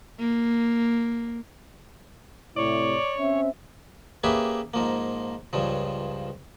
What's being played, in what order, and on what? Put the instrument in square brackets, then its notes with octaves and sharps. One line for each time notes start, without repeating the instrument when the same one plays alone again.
[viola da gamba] A#3
[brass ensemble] A2 C3 E4 [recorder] C#5 [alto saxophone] D5
[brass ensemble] C4 C#4 [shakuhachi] E5
[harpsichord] A#3 C#4 G4 G#4 B4 E5
G#2 F3 A#3
C#2 G2 C#3 F3